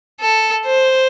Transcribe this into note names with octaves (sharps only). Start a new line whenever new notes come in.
A4
C5